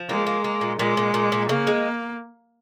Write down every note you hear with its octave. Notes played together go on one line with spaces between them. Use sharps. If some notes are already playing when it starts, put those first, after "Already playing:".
Already playing: F3
G#3 A#3
A#3
A#3
A#2
A#2 G#3
A#2
A#2
A#2
C#3 A#3
G#3